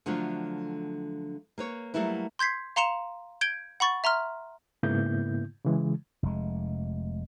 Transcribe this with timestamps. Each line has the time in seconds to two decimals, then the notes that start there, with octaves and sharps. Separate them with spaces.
0.06 D3 F3 F#3 A3 D4 F4
1.58 A#3 B4 C#5
1.94 F#3 G3 A3 A#3 E4 B4
2.39 C6 G6 G#6 B6 C7
2.76 F5 A#5 C6 C#7 E7 F7
3.41 G6 G#6 D7 G7
3.80 F#5 B5 C#6 A6
4.04 E5 A#5 C6 F6
4.83 G#2 C#3 A#3 B3 E4 G6
5.65 C#3 E3 G#3
6.23 F1 G#3